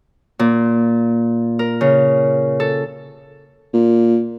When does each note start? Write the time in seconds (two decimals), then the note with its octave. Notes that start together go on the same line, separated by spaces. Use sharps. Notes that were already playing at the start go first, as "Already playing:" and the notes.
0.39 A#2
1.59 A#4
1.81 C#3
2.60 A4
3.74 A#2